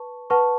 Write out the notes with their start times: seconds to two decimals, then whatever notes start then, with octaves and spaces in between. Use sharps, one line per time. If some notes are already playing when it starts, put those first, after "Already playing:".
Already playing: B4 A5 C#6
0.30 B4 F#5 A5 C#6